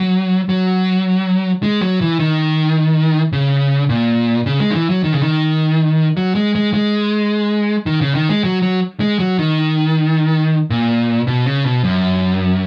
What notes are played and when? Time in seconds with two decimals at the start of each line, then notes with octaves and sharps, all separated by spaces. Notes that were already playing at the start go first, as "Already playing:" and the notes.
Already playing: F#3
0.49 F#3
1.63 G#3
1.81 F#3
2.01 E3
2.19 D#3
3.33 C#3
3.89 A#2
4.46 C#3
4.60 G#3
4.71 D#3
4.75 E3
4.90 F#3
5.04 D#3
5.12 C#3
5.22 D#3
6.17 F#3
6.35 G#3
6.55 G#3
6.74 G#3
7.86 D#3
8.01 C#3
8.15 D#3
8.29 G#3
8.44 F#3
8.62 F#3
9.00 G#3
9.19 F#3
9.39 D#3
10.70 A#2
11.27 B2
11.46 C#3
11.64 B2
11.84 F#2